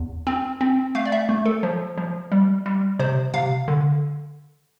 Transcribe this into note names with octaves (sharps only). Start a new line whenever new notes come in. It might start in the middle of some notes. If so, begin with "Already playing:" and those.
Already playing: E2
C4
C4
A3 F5
D5
E5
A3
A4
F3
F3
G3
G3
C3 C5
C3 F5
D3